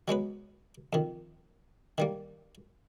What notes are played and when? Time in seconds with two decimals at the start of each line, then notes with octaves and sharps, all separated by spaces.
0.08 F#3 G#3 B3 B4
0.93 F2 D#3
1.98 D#3 G3 A#3